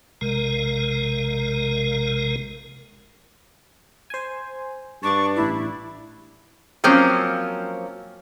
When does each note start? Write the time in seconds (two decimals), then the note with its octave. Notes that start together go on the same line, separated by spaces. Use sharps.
0.21 A#1 C3 G#3 A#4
4.10 C5 G#5
5.03 G2 D4 A5 C#6 D6 A6
5.36 A1 E4 D5
6.84 F3 F#3 A#3 C4 C#4